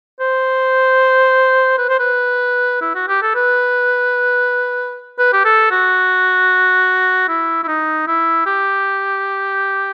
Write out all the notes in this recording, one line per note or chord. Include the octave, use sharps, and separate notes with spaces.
C5
B4
C5
B4
E4
F#4
G4
A4
B4
B4
G4
A4
F#4
E4
E4
D#4
E4
G4